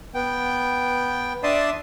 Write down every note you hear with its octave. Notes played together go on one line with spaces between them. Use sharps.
B3 G5
D4 D5 E5 A5 C6 D#6